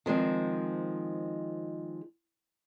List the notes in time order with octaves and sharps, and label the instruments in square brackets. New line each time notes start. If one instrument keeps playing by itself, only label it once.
[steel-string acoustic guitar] D#3 F3 G#3 C4